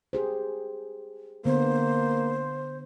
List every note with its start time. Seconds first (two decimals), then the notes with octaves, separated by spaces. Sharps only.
0.13 G4 G#4 C5
1.45 D3 A#3 B3 C5